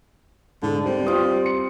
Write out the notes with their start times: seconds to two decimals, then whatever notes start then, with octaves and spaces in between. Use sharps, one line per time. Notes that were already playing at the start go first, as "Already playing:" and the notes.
0.63 G#2 D3
0.86 G3 C4
1.07 C4 F4 D#6
1.46 C#7